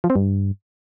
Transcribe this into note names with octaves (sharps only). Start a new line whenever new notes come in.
F3
C4
G2